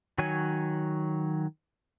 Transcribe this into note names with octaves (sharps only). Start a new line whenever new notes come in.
D#3 F#3 F#4 C#5 G#5